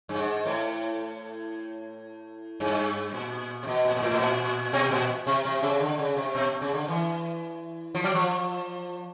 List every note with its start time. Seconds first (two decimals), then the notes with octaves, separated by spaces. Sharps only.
0.09 G2
0.19 G#2
0.46 A2
2.60 G2
3.14 A#2
3.63 C3
3.67 B2
3.85 A#2
3.97 A#2
4.02 A2
4.11 B2
4.20 A#2
4.73 B2
4.92 A#2
5.27 C3
5.45 C3
5.63 C#3
5.81 D3
5.99 C#3
6.17 C3
6.35 B2
6.62 C#3
6.74 D3
6.88 E3
7.95 F3
8.04 F#3
8.14 F3